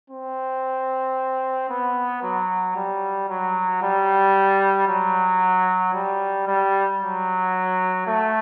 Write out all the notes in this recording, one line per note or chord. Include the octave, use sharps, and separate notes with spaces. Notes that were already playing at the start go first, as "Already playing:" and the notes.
C4
B3
F#3
G3
F#3
G3
F#3
G3
G3
F#3
A3